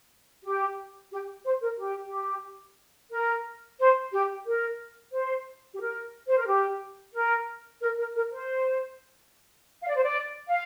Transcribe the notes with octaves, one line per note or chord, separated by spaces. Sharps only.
G4
G4
C5
A#4
G4
G4
A#4
C5
G4
A#4
C5
G4
A#4
C5
A#4
G4
A#4
A#4
A#4
A#4
C5
F5
D5
C5
D5
F5